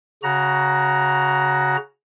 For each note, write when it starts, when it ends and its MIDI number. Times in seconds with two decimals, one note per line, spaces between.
0.23 1.77 49
0.23 1.77 66
0.23 1.77 82